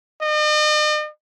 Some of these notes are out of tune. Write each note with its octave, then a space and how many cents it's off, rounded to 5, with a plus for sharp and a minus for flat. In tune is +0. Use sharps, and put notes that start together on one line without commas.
D#5 -45